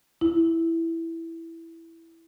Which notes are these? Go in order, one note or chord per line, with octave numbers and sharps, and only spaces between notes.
E4